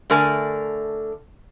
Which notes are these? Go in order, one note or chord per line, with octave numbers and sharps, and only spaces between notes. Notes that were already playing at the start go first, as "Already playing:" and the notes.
D3 A3 A#4 D5 G#5